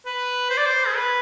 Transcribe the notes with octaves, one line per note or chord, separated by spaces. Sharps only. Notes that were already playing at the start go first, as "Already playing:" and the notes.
B4
C5
D5
C5
G#4
B4